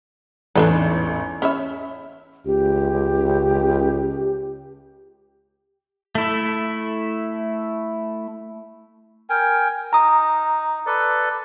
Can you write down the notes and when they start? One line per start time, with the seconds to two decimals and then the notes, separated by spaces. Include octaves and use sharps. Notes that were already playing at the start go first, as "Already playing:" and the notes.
0.56 A1 E2 G#2 D4 A4 B4
1.42 C#4 C#5 E5 B5
2.46 C#2 G4
6.15 A3 E4
9.30 A#4 G5 G#5
9.93 D#4 A#5 D#6
10.86 A4 B4 D5